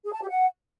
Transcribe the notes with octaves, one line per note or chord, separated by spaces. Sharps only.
G#4
A5
G4
F#5